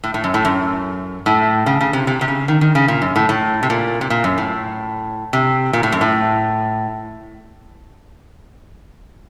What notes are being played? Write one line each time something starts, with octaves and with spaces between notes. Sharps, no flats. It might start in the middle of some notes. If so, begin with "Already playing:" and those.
A2
A2
F#2
A2
F#2
A2
C#3
C#3
C3
C3
C3
C#3
D#3
D#3
C#3
A#2
F#2
A2
A2
C3
A#2
C3
A#2
F#2
A2
C3
A#2
A2
F#2
A2